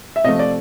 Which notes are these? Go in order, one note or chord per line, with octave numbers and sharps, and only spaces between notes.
E5
C3 F3 A3 D#5
D5